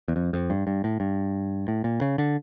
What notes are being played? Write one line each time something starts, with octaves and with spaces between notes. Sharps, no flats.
E2
F2
F2
G2
G2
A2
G2
A2
A#2
C#3
D3